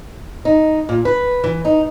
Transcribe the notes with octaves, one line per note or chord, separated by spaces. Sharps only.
D#4
A#2
B4
E3
D#4